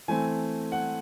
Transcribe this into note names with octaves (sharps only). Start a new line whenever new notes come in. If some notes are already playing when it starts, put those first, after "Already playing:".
E3 A3 C4 G#5
F#5